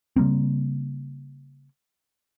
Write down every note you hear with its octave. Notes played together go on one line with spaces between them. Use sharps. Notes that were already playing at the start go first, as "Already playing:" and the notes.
C#3 G3 A#3 C4